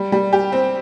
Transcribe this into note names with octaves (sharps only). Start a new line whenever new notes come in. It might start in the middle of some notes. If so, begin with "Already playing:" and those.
Already playing: G3
G3
G4
C4